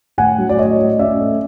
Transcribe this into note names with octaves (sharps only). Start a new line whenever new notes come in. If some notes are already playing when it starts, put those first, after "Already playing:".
A2 F#5 G#5
F#3
D5
A2 C#5 D#5
A2
C#4 D5 E5
A3